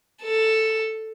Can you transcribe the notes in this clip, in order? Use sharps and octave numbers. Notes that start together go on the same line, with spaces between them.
A4